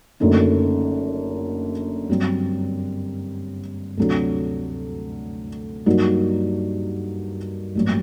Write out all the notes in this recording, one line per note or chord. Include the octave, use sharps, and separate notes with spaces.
F#1 F#2 D3 A3 D#4
G2 F#3 C4
D2 C3 F#3 A3 D4
G2 F#3 A#3 D#4 F#4
A1 G2 F#3 A#3